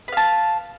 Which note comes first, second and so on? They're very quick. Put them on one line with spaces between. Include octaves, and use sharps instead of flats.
B4 F5 A5